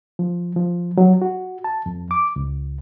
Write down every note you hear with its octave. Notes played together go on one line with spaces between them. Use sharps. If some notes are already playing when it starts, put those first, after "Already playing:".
F3
F3
F#3
F#4
A5
F2
D6
C#2